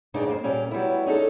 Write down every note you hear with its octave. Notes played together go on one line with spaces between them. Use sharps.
G2 C#3 D4 D#4
F2 G#2 A#3 C5
D2 A#2 G3 C#4 A#4
F#3 G3 B3 E4
C#4 D#4 G#4 A4